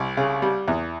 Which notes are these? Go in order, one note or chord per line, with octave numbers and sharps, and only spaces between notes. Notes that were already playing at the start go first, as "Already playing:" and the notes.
Already playing: C2
C#3
G3
E2